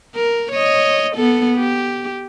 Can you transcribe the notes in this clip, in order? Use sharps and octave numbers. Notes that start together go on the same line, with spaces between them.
A#4
C#5 D#5
B3 A4
G4